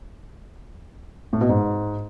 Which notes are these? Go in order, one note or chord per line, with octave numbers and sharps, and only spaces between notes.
A2
B2
G#2